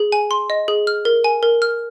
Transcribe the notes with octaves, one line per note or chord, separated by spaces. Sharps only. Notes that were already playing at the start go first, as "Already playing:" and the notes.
Already playing: G#4
G#5
C6
D#5
G#4
F6
A#4
G#5
A#4
F6